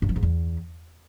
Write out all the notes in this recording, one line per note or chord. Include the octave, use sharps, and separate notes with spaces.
G2
F3
G#2
E2